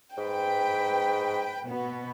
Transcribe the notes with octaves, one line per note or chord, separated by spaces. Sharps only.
G#2 B4 G5
B2 B3